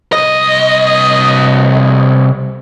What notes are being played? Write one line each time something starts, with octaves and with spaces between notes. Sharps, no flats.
C2 D#5